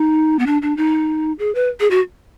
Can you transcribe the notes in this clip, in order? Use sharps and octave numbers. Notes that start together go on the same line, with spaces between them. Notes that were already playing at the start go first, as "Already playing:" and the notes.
Already playing: D#4
B3
D4
D4
D#4
G#4
B4
G#4
F#4